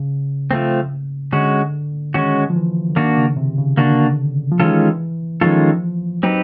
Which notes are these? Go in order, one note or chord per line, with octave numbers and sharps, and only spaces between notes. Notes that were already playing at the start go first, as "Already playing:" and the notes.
Already playing: C#3
F3 A3 C4
D3 G#3 C#4 F#4
D#3 G#3 C#4 F#4
F3
E3
D3
D#3 A#3 D4 F#4
C#3
C3
C#3
D3 A#3 D4 F#4
F3
D#3 E3 G#3 C#4 F4 A4
D#3 F3 G#3 C#4 F4 A4
F#3 C4 D#4 G4 B4